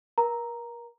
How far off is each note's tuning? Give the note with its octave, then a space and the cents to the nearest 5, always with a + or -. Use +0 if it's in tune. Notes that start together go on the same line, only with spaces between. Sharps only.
A#4 +35 A#5 +0